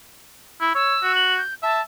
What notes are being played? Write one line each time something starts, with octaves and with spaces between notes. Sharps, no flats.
E4
C#5 E6
F#4
F#7
G6
E5 A5